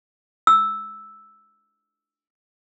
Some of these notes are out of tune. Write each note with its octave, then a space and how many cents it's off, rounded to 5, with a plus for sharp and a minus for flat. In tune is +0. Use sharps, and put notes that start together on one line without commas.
E6 -5